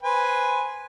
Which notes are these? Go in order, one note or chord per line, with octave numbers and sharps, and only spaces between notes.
B4 C5 G#5